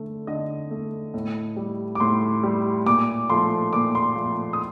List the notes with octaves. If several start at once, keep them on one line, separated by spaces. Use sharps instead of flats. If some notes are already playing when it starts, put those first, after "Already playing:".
Already playing: D3 A3
D3 D#5
A3
A2
G3
D6
A2 C6
G3
A#2 D6
F3 A3 C6
A#2 D6
C6
F3 A3
D#6